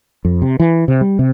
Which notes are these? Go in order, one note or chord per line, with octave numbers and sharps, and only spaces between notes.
F2
C3
E3
C3
G3
C3